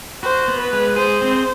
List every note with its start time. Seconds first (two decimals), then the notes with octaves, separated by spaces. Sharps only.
0.23 F#4 C5
0.48 B3
0.60 B4
0.73 G#3
0.96 G#4 C5
1.21 C4